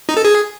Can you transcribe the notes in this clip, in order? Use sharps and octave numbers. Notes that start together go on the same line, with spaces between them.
D#4
A4
G#4